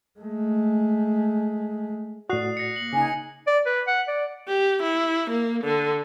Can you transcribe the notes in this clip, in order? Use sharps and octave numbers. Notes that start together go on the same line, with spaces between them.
G#3 A3
A2 F#4 D5 D#6 F#6 C7
A#6 C#7
A#3 F#7
C#3 D#4 G#5
D5
B4
F#5
D5
G4
E4
A#3
D3